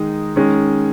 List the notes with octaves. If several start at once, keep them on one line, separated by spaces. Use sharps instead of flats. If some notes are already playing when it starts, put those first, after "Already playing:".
Already playing: D#3 G#3 D#4
D#3 G#3 C#4